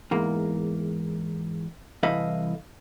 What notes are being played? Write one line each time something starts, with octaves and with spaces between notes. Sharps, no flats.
E2 G#2 A#3
C2 E3 A4 B4 D#5 F5